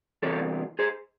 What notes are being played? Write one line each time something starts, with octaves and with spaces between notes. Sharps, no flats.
E2 C3 E3 C4 A4 C#5
G#4 C5